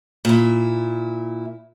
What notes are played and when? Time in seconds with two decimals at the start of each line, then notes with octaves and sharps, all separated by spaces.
0.25 A#2 E4